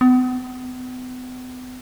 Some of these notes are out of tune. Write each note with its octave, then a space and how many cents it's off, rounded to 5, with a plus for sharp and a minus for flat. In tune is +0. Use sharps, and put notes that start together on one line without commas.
B3 +40